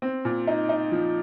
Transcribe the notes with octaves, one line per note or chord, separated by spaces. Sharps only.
C4
A#2
D#4
D#4
F3